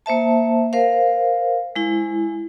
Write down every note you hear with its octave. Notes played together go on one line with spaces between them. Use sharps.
A#3 C5 E5 A5
A#4 C5 F5
G#3 E4